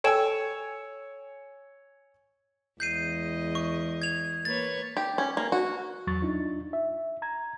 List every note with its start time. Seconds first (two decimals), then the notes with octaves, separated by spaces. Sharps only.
0.04 A4 C#5 G5 G#5 E6 E7
2.80 E2 G#3 D#5 G6 C7 D#7
3.55 C#6
4.02 G#6 F7
4.45 A#3 B4 C#5 A6
4.97 G4
5.18 C#4
5.37 A#3
5.52 F#4
6.07 E2 F#3 C#6 A6
6.22 D4 D#4 F4
6.73 E5
7.22 A#5 G#6